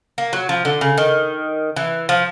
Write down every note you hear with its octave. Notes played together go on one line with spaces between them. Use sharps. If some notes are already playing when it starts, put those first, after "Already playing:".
A#3
F#3
F3
D3
C#3
D#3
E3
F3